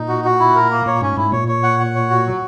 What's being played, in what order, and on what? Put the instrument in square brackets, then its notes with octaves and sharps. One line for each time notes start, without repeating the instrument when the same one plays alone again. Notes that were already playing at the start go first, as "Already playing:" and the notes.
Already playing: [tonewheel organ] A#2 [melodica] D#4
[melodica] F#4
F#4
E4
A#4
A#3
[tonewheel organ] A#2 [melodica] C#5
[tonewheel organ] G#2 [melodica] C#4
[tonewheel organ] G#2 [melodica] E4
[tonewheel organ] A#2 [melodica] C#5
[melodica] C#5
F#5
F#5
C#5
F#4
F#3